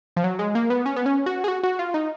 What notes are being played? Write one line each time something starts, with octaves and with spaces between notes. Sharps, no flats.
F3
F#3
G#3
A#3
B3
C#4
B3
C#4
F#4
G#4
F#4
F#4
F4
D#4